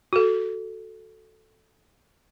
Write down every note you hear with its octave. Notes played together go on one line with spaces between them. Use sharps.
F#4 A4